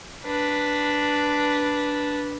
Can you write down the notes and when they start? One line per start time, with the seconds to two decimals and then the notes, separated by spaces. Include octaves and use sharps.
0.24 D4 B4